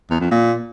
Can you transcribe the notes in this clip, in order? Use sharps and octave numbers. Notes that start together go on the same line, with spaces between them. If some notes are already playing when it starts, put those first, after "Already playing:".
E2
F2
A#2